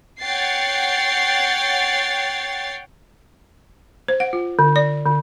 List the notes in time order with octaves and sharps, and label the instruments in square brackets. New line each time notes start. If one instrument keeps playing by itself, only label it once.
[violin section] C#5 F#5 G5 A6 C7
[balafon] C5
F#5
F4
D3
D5
D3